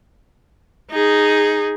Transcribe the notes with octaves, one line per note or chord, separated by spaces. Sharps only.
D#4 G#4